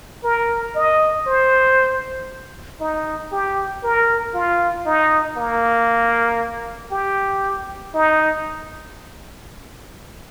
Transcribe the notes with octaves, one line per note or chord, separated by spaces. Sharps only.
A#4
D#5
C5
D#4
G4
A#4
F4
D#4
A#3
G4
D#4